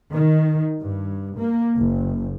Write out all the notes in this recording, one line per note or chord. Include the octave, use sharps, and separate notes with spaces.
D#3
G2
A#3
F#1